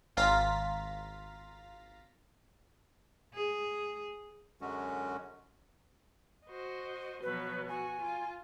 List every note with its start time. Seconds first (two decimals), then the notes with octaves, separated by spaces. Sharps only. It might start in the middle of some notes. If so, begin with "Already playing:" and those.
0.17 G#1 F4 F5 A#5 A6 B6
3.34 G#4
4.61 F#2 D3 F#3 G#3 C#4 F#4
6.46 F#4 C5 D#5
7.22 B2 F3 F#3 B4
7.68 F#4 G#5
8.01 F4